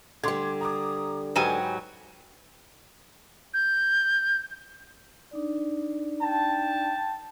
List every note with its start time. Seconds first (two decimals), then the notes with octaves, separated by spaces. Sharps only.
0.24 D3 G3 C6 D6 G#6
0.61 A#5 D6 D#6
1.36 G#2 F#3 G4 B4 C5 G5 G#5
3.54 G6
5.31 D4 D#4 D5
6.22 G5 A5